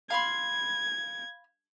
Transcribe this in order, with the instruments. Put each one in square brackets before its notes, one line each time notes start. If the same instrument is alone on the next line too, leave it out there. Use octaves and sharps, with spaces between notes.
[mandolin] F5 B5 C6 [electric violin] G#6